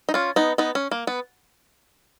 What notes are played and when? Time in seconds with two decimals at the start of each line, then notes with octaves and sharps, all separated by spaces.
0.09 D#4
0.14 C#4 F4
0.36 B3 D#4
0.58 B3 D#4
0.75 C#4
0.91 A#3
1.07 B3